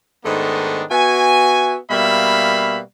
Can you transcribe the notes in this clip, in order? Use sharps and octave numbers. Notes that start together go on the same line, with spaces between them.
G#2 D#3 A3 B3 D4 D#4
B3 F#4 E5 G#5
B2 G3 A#3 E5 F5 B5